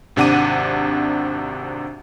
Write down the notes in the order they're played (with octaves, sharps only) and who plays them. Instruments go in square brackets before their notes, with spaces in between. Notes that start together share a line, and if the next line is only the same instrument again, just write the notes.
[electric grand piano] G#1 C3 D4 F#5 D6 D#7